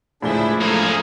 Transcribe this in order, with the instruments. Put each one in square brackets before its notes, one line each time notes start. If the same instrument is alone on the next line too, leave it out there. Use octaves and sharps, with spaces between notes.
[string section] C#2 E4 [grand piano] A2 F3 G7 [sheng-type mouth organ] D4 G#4
[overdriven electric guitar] A#3 G#4 [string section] A4 [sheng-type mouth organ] C5 F5 A#5